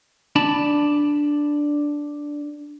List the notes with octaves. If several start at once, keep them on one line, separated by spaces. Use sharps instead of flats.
D4 A5 B5